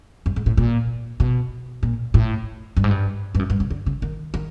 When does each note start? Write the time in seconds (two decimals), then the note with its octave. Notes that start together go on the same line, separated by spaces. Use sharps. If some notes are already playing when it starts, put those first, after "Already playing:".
0.26 G2
0.36 G#2
0.46 A2
0.57 A#2
1.20 B2
1.83 A#2
2.14 A2
2.77 G2
2.84 G#2
2.91 G2
3.35 G2
3.39 F#2
3.50 G2
3.60 C#3
3.70 D3
3.86 C#3
4.02 D#3
4.34 D#3